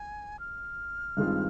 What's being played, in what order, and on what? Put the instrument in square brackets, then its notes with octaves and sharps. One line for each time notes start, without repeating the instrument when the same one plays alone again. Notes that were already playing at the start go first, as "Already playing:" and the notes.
Already playing: [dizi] G#5
F6
[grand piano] G2 D#3 G#3 C4 F4